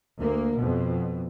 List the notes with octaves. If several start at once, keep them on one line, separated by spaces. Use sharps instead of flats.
D2 A#3
F2 B2